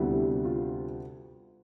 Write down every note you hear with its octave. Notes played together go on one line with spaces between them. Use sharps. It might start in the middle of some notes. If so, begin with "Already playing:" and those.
Already playing: D2 C3 G3 B3 E4
F4